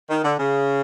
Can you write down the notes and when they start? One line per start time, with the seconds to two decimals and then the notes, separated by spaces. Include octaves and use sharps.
0.10 D#3
0.24 D3
0.39 C#3